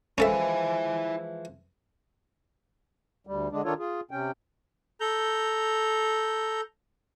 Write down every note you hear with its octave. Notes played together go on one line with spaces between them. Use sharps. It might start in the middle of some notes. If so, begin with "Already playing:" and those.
E3 F3 G#3 C#4 E4 A4 E5 G#5
D2 G3
D3 G#3 D4
D#3 D4 F4 A4 C#5
F4 G#4
C3 C#4 G5
A4 A#5 G6